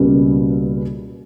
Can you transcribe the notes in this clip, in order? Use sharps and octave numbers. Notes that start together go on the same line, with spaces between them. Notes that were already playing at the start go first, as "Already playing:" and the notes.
Already playing: C#2 B2 G3 A#3